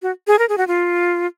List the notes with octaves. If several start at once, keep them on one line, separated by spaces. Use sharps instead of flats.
F#4
G#4
A#4
G#4
F#4
F4